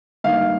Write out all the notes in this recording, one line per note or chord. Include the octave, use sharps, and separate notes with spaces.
G2 D#3 A#3 D#4 F5